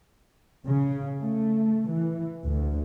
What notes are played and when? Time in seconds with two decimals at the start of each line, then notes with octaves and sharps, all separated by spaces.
0.66 C#3
1.22 A3
1.90 E3
2.45 D2